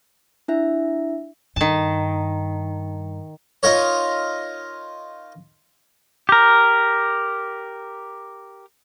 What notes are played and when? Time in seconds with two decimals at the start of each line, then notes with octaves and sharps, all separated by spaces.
0.48 D4 E4 E5
1.56 G2 D#3 A5
3.63 D#4 F4 A#4 C#5
6.29 G4 A#4